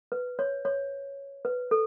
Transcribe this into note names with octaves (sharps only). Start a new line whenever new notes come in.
B4
C#5
C#5
B4
A4